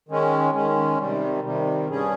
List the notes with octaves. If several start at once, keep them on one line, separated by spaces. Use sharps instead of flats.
D#3 G#3 C#4
D#3 G#3 C#4
C3 D#3 G3
C3 D#3 G3
G2 G3 C#4 G#4